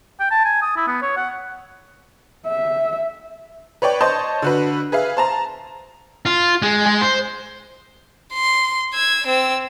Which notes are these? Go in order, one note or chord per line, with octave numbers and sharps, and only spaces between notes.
G5
A5
G#5
D#6
E4
B3
C#5
F#5
E5
B4 C#5 D5 G5
C5 C#5 D#5 A5 C6 G6
D3 F#4 B4
G#4 B4 E5 F5
C5 A5 A#5
F4
G#3
G#3
C5
C6
E6 G#6
C4 E6